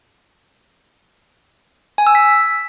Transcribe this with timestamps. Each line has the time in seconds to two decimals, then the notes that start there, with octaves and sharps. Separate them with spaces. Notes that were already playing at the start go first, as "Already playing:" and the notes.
1.98 G#5
2.07 E6
2.15 B6